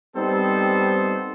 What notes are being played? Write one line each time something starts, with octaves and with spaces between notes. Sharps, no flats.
G3 B3 C4 D#4 A4 C5